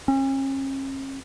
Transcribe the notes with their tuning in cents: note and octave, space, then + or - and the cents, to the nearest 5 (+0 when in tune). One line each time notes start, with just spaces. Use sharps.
C#4 -40